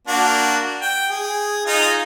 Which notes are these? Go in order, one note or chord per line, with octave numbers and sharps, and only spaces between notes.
A#3 D4 F#4
G5
G#4
D#4 F4 G#4